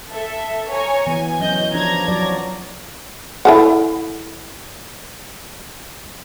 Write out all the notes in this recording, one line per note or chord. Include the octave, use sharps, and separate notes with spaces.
A4 E5
C#5 G#5 A#5
E3 B3 G#5
F#3 C#4 D#5 G6
F3 D4 A#5 G#6 A#6
F3 F#3 D5
E4 A4 F#5